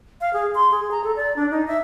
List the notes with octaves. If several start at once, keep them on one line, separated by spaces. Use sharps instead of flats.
F5
G#4
C6
G#4
A#5
A4
D5
D4
D#4
E5